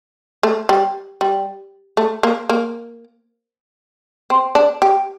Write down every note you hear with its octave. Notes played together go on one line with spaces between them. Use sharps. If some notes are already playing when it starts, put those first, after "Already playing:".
A3
G3
G3
A3
A#3
A#3
C4
D4
G4